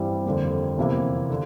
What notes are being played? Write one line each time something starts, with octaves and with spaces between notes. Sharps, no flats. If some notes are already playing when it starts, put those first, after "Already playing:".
Already playing: G2 E3 G3 C4
F2 D3 G3 A#3
E2 C3 F3 A#3 E4
D3